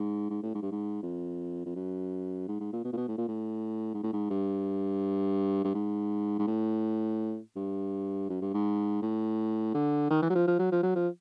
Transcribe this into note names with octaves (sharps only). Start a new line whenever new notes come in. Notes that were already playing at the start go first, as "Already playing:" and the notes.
Already playing: G#2
G#2
A2
G#2
G2
G#2
F2
F2
F#2
G#2
G#2
A#2
B2
A#2
B2
A2
A#2
A2
G#2
A2
G#2
G2
G2
G#2
G#2
A2
G2
F#2
G2
G#2
A2
D3
D#3
E3
F#3
F3
F3
F#3
F3
F#3
F3